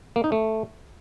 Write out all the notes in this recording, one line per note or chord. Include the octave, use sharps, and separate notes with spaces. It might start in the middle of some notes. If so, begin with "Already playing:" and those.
A#3
D#4
A3